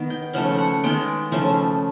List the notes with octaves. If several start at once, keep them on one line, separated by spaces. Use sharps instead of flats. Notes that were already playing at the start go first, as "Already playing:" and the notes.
Already playing: D#3 B3
G5
C#3 F3 A3 F#5
F#5
D#3 G#3 B3 G5
C#3 F3 A3